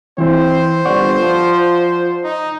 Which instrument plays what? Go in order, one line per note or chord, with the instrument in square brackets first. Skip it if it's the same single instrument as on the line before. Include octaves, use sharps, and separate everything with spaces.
[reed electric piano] E3 E4 [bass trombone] C4 [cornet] C5
[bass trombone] G1 [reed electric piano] D5 F#5 C#6
[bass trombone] F3
[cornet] D#4